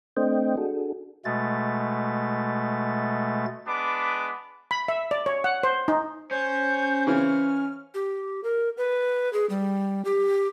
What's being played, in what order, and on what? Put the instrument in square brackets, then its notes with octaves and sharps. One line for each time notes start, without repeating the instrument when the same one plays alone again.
[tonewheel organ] A3 C4 D4 C5 D#5 G5
D4 F#4 G#4 A4
[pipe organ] B2 G#3 A3 A6
[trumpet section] G#3 B3 D4 B4 D6
[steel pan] B5
E5
D5
C#5
F#5
C5
D#4
[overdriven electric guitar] C#4 [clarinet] C5 [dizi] G6
[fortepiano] C#3 E3 [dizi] F6
[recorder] G4
A#4
B4
G#4
G3
G4